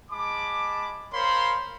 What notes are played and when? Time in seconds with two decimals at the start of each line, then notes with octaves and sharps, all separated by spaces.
0.10 G#3 A5 B5 D6
1.13 A#4 C5 C#5 F5 B5 C6